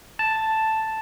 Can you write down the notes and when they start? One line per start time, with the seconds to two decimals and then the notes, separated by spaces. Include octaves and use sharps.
0.19 A5